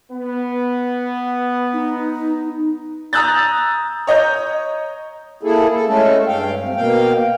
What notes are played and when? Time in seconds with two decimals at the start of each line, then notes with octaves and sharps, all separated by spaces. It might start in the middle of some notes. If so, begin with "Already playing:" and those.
0.11 B3
1.73 D#4
3.13 A#5 D#6 E6 F#6 G6 A6
4.07 C#5 D#5 A#5 G6
5.43 A#3 E4 G#4 A4
5.73 A4
5.87 G#3 A3 C#4 A4
6.27 G2 F5 G5
6.59 C3
6.76 B2 A#3 F5 G5